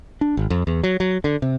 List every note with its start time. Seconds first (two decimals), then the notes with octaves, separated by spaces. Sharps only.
0.21 D4
0.37 G#1
0.50 F2
0.67 E2
0.83 F#3
1.00 F#3
1.24 D3
1.42 C3